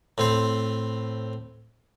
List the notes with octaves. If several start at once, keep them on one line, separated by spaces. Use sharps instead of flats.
A2 C4 C5